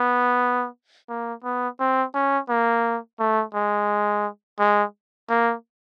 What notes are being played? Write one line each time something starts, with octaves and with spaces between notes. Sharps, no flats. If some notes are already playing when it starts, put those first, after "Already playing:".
Already playing: B3
A#3
B3
C4
C#4
A#3
A3
G#3
G#3
A#3